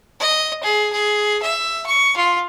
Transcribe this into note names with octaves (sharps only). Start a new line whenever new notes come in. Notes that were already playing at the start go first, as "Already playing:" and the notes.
D#5
G#4
G#4
E5
C#6
F4